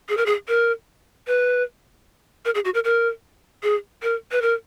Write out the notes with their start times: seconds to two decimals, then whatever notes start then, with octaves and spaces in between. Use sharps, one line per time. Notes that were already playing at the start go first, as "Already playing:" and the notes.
0.09 G#4
0.17 A#4
0.26 G#4
0.48 A#4
1.27 B4
2.45 A#4
2.55 G#4
2.65 F#4
2.74 A#4
2.85 A#4
3.63 G#4
4.03 A#4
4.32 B4
4.42 A#4